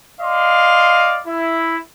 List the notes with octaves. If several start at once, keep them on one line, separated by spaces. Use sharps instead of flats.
D5 D#5 F5 C6
E4